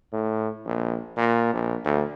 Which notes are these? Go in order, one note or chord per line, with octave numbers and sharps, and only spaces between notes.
A2
A#1
A#2
A#1
D2